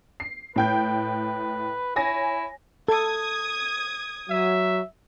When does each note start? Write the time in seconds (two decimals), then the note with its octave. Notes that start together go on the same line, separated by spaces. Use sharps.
0.20 C7
0.56 A2 B4 G5 G6
1.96 E4 C#5 G#5 A#6
2.88 A4 D#6 G#6
4.30 F#3 E5